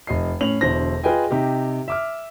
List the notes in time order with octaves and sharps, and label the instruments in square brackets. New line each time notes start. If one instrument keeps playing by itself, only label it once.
[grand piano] F1 D#5 C7
A2 C#4 F7 F#7
E1 B2 D3 E4 C5 A#6
F4 G#4 B4 D#5 G5 G#5
C3 D#4 G4
E5 D6 F6